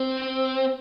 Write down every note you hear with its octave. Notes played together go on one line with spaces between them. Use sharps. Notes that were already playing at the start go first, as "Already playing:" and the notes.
Already playing: C4